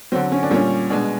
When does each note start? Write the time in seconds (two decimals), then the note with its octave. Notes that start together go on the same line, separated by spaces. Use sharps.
0.12 D3 F#3 C4
0.32 C#4
0.43 D4
0.51 A#2 G3 C#4
0.90 B2 G#3 D4